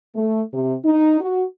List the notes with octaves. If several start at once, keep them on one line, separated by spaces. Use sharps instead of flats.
A3
C3
D#4
F#4